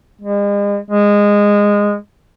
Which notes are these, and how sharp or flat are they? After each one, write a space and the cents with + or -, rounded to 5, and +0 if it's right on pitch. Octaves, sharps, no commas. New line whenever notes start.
G#3 -40
G#3 -15